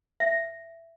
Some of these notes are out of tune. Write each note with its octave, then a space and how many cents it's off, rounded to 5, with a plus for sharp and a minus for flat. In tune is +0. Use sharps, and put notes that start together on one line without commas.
E5 +10